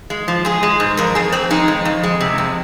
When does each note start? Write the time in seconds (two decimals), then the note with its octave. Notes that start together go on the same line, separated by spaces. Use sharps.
0.10 G#3
0.28 F3
0.45 G#3 G#4
0.63 G#3
0.80 G#2
0.97 F2 A#4
1.15 F2 G#4
1.32 F2 C4
1.50 G#3 D#4
1.68 F2
1.85 F2
2.03 G#3
2.21 C3
2.38 F2